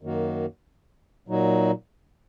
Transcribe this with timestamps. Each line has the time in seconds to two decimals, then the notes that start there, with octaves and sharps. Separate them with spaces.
0.02 F#2 D#3 A#3 F#4
1.28 A#2 F#3 D#4 F#4